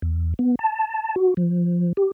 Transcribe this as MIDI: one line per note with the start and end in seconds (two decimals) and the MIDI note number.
0.02 0.34 40
0.39 0.55 59
0.59 1.15 81
1.16 1.34 66
1.37 1.93 53
1.97 2.11 67